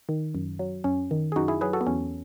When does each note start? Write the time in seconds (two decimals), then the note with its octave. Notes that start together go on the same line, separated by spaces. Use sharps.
0.09 D#3
0.35 F#2
0.59 F#3
0.84 F#2 C#4
1.11 D#3
1.32 G#4
1.36 F#2 D#4 F#4
1.48 E4 G#4
1.61 F#3 G#4 B4
1.73 F#4 A4
1.81 B3
1.86 E2 C#4